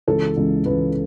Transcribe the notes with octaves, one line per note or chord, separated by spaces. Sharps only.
C#2 C#3 E3 A4
C#2 C#3 E3
C#2 C#3 E3 B4